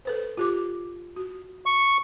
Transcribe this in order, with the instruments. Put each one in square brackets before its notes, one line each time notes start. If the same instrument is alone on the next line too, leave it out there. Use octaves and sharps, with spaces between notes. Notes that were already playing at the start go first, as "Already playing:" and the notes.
[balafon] A4 B4 C5
F4 G4 D6
F#4
[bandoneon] C#6